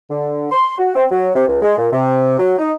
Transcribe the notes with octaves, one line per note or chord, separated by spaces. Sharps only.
D3
C6
F#4
C4
F#3
C3
C#2
G#3
A#2
C3
F#3
D#4